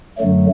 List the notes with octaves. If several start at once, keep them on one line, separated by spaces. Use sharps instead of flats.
F#2 D3 F#3 A3